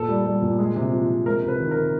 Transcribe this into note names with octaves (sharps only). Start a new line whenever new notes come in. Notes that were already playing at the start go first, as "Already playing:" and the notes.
Already playing: A#2 A4
G3
G3
A#2
G#3
C3
F3
C3
G#3 A#4
C3 B4
D#3
A#4
C3